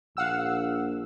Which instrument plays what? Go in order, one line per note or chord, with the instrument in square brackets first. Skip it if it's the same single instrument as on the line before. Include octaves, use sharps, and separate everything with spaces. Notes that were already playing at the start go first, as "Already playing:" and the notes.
[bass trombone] A#1 [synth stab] F5 F#5 E6